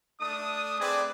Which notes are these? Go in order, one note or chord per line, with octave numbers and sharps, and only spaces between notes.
A3 D4 D#6
A3 C4 G#4 B4 D5